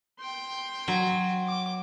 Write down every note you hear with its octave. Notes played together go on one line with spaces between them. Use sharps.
G5 C6
F#3
D6